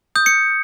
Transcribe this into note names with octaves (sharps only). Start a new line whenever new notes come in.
D#6 G6
C#7